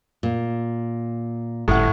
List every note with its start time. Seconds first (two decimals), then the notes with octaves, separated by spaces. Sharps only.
0.23 A#2
1.68 G1 A2 F#5